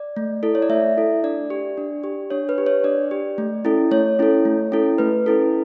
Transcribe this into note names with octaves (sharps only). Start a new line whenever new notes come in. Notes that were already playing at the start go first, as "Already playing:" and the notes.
Already playing: D5
A3
E4 A4
C#5
D5
A3 E5
E4 A4
D4 D5
G4
D4
G4
D4 C#5
B4
G4
C#5
D4 D5
G4
A3
C#4 E4 A4
A3 C#5
C#4 E4 A4
A3
C#4 E4 A4
A3 B4
C#4 E4 A4